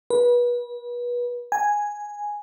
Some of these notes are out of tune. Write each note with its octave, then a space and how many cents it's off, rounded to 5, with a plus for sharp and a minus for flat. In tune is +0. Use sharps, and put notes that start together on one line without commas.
B4 -30
G#5 -5